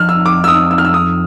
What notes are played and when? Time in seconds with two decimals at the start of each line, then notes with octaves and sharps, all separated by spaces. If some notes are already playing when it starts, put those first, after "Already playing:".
Already playing: F2 F6
0.09 E6
0.26 D6
0.44 E6
0.48 D#6
0.71 E6
0.78 F6
0.85 E6
0.94 D#6